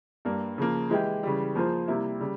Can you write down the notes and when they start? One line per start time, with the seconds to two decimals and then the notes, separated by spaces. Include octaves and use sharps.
0.25 G2 G3 A#3
0.58 C#3 F3 A#3
0.90 E3 G#3 E4 G4
1.23 C#3 E3 G3
1.55 F3 A#3 F4 G#4 C5
1.88 C3 G3 A#3 E4
2.20 C#3 G3